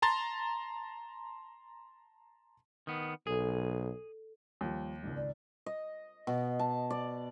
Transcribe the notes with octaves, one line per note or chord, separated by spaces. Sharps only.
A5 A#5 C6 A6
D#3 B3
B1 G#4 A4
D#2 F3 G3
G#1 C#2
D5
D#5
B2
A5
D5